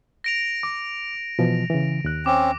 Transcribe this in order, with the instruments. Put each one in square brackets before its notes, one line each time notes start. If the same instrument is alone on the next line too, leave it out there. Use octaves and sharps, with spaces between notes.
[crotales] A#6 D7 F7
[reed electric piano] D6
B2 E3 F3
C#3 E3
D#2 F#6
[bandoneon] C4 C#4 [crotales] D6